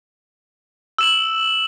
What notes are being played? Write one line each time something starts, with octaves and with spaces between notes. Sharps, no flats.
E6 E7 F#7